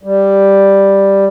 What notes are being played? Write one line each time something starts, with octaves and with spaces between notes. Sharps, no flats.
G3